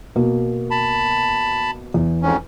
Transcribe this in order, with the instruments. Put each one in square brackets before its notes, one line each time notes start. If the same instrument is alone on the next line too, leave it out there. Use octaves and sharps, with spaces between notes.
[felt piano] B2 A#3
[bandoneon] A5 B5
[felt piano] E2
[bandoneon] F2 G#2 C#4